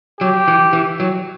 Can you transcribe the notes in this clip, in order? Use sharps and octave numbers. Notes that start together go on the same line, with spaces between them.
F#3 G4
E3
E3
F#3